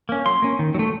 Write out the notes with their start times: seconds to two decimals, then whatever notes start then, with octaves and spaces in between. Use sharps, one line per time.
0.09 A#3 C#4
0.26 F#3 C6
0.42 A#3 C#4
0.59 D#3
0.74 F#3
0.79 A3